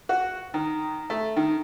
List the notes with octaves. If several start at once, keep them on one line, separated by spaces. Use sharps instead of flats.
F#4
D#3
A3
D#3